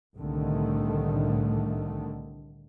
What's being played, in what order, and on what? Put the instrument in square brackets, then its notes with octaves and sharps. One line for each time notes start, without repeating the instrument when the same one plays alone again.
[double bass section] C2 A2 D3 D#3 A3